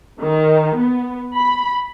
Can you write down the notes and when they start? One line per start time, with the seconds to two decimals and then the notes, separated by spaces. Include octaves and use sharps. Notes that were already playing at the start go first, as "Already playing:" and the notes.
0.21 D#3
0.77 B3
1.36 B5